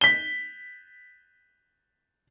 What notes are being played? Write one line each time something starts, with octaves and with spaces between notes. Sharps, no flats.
B6 G7